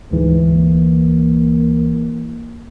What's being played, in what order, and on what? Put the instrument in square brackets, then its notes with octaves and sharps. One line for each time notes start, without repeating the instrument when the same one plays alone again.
[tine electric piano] D2 E3 [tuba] G#2
[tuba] A#3